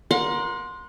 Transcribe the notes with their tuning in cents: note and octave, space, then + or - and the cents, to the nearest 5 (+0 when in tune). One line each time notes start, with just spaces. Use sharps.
A#4 +25 F#5 -35 C6 +0